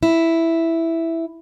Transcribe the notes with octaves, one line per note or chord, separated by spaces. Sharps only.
E4